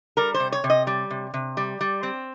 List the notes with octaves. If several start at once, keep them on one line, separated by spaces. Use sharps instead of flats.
G3 A#4
C5
C3
C#5
C3
D#5
G3
C3
C3
G3
G3
C4